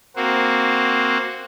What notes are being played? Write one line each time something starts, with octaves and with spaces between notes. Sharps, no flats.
A#3 C4 F#4